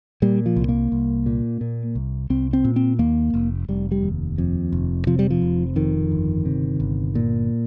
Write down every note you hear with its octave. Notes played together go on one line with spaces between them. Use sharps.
A#2 G3
F3
C2
A#3
C2
A#2
A#2
C2
C2 C4
C4
A#2
C4
D#2 A#3
F1
F1 G3
G3
D#2
F2
F1
C3 F3
G3
F3
F1
F2 D#3
G1
C3
G1
A#2